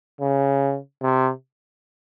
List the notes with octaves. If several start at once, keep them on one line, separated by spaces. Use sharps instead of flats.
C#3
C3